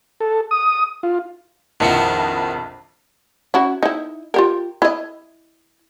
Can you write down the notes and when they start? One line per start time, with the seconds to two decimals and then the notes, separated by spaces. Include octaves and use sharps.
0.20 A4
0.51 D#6
1.03 F4
1.80 A#1 F2 D#3 B3 E4 C#7
3.54 C#4 E4 F#4
3.83 D#4 E4
4.34 F4 G4 A#4
4.82 E4 D#5